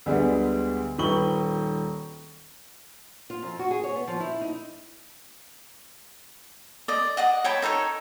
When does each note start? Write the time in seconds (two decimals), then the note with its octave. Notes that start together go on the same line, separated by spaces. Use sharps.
0.06 D2 D3 G3 G#3 B3
0.98 D#1 D#3 B4 C#6 F#7 G7
3.30 F4
3.43 F2
3.59 F#4
3.71 G#4
3.84 C#5
3.96 B3
4.08 F3
4.20 E4
4.41 D#4
6.88 D5 D#5
7.17 D#5 F#5 D6
7.44 C#5 G5 A5 B5
7.62 D#4 A4 B4 C#5